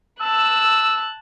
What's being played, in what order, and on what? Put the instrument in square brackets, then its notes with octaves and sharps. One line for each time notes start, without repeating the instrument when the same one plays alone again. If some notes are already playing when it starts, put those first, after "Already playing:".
[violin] A5 F#6 [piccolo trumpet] E6